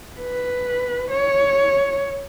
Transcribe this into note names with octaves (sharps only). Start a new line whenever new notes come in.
B4
C#5